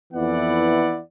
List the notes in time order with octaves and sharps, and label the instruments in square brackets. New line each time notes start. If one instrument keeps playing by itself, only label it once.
[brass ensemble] F2 E3 B3 E4 D5 F#5